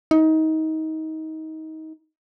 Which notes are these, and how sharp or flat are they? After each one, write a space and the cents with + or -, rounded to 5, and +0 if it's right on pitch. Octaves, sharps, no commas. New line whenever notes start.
D#4 +25